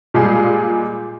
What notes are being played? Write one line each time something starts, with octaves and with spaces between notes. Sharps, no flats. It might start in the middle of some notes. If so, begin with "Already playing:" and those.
A#2 G3 G#3 F4 G#4